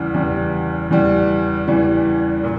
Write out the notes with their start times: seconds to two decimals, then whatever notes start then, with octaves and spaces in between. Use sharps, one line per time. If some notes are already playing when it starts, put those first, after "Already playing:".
Already playing: E2 C#3 E3 G3
0.14 E2 C#3 E3 G3
0.91 E2 C#3 E3 G3
1.67 E2 C#3 E3 G3
2.43 A#2